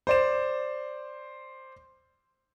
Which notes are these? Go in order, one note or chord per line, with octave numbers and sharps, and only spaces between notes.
C5 D5 E7